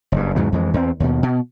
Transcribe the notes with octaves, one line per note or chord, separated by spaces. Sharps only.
F#1 G2
E2 G#2 C#3 F#3
F2 E3 G#3
E2 C4
D#2 B2
B2